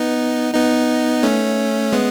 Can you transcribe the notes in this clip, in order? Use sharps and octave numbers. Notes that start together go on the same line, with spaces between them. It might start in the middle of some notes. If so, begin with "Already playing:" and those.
Already playing: B3 D#4
B3 D#4
A3 C#4
G#3 B3